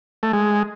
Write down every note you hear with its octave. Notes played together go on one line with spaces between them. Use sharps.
A3
G#3